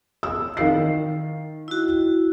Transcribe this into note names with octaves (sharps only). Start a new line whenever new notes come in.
E6
D#3 F5 C7
E4 F#4